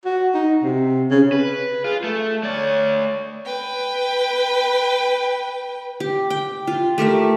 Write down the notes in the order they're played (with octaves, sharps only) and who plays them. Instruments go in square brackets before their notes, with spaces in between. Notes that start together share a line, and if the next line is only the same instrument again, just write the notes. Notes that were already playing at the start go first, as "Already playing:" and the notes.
[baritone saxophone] F#4
D#4
C3
C#3
[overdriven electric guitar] B4
[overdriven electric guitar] F4 [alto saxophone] G#4
[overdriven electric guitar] A3 [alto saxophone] A4
[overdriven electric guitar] A3 D5 [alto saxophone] C#5
[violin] B4 G5
[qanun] G4
G5
F4
A3 G4 A#4 E5